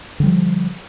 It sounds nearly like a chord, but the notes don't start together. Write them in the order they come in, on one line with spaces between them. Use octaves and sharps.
D3 G3 F3